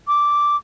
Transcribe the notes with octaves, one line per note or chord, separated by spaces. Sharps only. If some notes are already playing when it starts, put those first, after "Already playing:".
D6